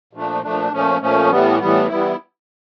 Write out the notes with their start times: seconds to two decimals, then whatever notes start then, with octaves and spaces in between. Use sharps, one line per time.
0.13 A#2 F3 A3 D4
0.43 A#2 F3 A3 D4
0.72 A#2 F3 A3 C#4
1.01 A#2 F3 A3 C#4
1.31 A2 E3 G3 B3
1.59 A2 E3 G3 B3
1.88 E3 G3 B3 E4